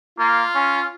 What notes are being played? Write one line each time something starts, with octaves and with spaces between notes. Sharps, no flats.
A#3 F4
C#4